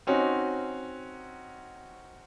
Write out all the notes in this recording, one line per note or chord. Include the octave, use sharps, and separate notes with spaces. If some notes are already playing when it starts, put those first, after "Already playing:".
C4 C#4 D#4 F#4